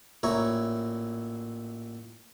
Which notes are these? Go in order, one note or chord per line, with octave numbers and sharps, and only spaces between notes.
A1 A#2 C#5 E5 A#5